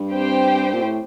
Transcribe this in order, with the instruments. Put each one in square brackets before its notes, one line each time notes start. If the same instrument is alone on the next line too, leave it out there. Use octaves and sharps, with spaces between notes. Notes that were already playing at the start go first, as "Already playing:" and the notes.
Already playing: [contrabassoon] G2
[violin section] C4 G4 C5 G5
[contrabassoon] A#2
A2